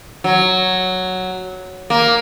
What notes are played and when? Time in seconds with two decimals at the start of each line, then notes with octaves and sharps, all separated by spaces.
0.24 F#3
1.90 A#3